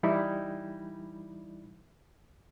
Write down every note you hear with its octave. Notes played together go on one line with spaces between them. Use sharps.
E3 G3 D#4 E4